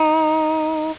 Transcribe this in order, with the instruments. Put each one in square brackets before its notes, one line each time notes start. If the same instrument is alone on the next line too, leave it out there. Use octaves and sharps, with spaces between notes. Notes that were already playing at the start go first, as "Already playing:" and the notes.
Already playing: [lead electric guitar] D#4